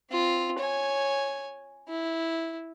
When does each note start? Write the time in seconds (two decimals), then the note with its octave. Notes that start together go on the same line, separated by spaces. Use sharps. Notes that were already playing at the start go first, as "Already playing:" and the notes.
0.10 C4 F4
0.59 C#5 G#5
1.89 E4